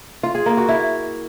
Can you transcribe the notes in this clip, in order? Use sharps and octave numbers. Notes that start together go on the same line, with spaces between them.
F4
G#4
A#3
F#4
E4